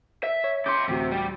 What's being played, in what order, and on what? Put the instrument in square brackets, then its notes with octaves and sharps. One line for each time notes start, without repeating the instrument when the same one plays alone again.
[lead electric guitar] E5
[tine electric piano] C#5
[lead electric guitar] C#3 C6 [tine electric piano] D6 G6
[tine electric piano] A1 D2 F#4 [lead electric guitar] C3
[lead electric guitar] G3